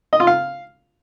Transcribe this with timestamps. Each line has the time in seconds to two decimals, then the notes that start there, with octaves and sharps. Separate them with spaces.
0.13 D#5
0.20 F4
0.27 F5